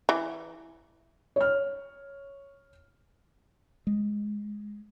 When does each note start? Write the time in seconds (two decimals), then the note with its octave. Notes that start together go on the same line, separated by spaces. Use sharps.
0.09 E3
1.36 C#5 F6
3.87 G#3